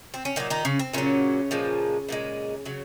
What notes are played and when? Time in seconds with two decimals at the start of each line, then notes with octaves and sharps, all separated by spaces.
0.14 C4
0.25 C#4
0.36 A#2 D#3 F#3 D#4
0.50 D#3 D#4
0.65 C#3 C#4
0.79 C4
0.93 A#2 C#3 F#3 C#4
1.51 A#2 F3 G#3
2.09 A#2 F3 G#3
2.65 C#3 F#3